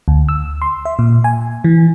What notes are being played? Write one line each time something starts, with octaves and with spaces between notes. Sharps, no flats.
D2
E6
C6
E5
A#2
G#5
E3